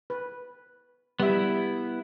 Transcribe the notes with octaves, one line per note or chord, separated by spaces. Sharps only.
B4
G3 B3 E4 E5